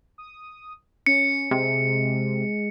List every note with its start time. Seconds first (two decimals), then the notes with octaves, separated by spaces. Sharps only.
0.18 D#6
1.06 C#4 C#7
1.51 C3 G#3